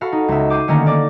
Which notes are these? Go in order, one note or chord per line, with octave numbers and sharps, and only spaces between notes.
F#4 A4 F5 B5
D#4
C#2 E5
D6 G6 C7 D#7
D3 D#3 A3 A#3 C#4 D#4
A#3 D5 D6